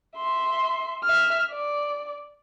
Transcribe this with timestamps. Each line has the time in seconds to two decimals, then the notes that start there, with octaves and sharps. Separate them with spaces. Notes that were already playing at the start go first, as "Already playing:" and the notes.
0.16 E5 C6
1.04 E5 F6
1.51 D5